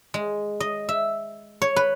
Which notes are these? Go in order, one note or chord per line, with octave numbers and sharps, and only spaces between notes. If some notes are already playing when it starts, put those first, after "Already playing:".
G#3
D#5
E5
C#5
B4